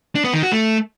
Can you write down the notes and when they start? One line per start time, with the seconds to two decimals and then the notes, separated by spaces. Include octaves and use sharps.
0.15 D4
0.24 B3
0.33 D#3
0.43 F#4
0.52 A3